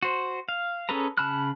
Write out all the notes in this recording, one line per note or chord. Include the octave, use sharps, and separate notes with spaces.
F#4 C5
F5
C#4 G#4 A4 B4 A#5
C#3 A5 B5 F6 F#6